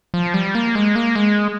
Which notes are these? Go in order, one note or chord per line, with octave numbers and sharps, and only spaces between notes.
F3
G3
A#3
G#3
A#3
G#3